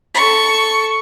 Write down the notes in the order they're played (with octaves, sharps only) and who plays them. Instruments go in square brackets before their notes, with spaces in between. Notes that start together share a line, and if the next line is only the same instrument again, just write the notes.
[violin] A4 C#6